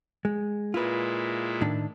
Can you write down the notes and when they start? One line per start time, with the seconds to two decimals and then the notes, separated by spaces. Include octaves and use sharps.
0.25 G#3
0.74 A#2 G#3 E4 F4 B4
1.61 A2 D#3 D4